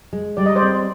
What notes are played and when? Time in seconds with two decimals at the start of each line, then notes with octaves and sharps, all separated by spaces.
0.13 G#3
0.37 G3 D5
0.46 D#5
0.56 C5 D5
0.62 C4